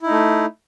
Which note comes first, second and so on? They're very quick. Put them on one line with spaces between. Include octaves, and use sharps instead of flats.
E4 D#4 A3